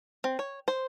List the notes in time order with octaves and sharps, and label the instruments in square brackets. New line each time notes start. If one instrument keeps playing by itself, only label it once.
[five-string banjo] C4
C#5
C5